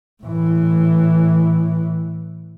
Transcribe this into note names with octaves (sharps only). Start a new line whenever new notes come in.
A2 E3